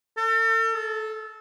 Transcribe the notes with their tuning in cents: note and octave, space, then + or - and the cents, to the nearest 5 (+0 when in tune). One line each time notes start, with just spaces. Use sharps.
A4 +40
A4 -20